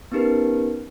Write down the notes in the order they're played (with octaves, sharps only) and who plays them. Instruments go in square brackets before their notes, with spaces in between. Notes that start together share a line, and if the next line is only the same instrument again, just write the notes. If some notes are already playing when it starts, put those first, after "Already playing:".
[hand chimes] B3 C#4 D#4 G4 A#4 B4